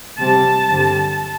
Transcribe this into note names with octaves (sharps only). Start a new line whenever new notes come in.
C3 G3 C4 A5
G2 D3 G3 C4